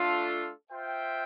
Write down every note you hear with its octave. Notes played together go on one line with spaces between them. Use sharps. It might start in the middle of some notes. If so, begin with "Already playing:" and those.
Already playing: A3 D4 F4 A4
F4 C5 E5 G5